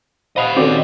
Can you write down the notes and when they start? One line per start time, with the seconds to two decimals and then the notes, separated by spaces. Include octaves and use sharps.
0.36 C5 D#5 F5 F#5 B5 D#6 F7
0.56 D#3 C4 C#4 F#4 A4 D5 D6